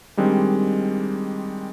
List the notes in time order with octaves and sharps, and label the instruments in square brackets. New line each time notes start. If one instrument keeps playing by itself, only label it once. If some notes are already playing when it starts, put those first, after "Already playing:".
[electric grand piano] D#3 G3 G#3 C4 D4